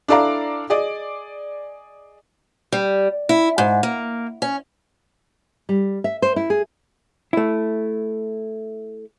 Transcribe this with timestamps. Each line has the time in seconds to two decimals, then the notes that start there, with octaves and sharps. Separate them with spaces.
0.08 D4 E4 A4 D5 F5 A#5
0.70 G#4 D5 D#5
2.72 G3
3.29 E4
3.58 G#2
3.83 A#3
4.42 C#4
5.69 G3
6.04 E5
6.22 C5
6.36 E4
6.50 G#4
7.33 A3 E4